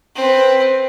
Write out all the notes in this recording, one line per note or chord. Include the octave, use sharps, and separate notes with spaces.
C4 B4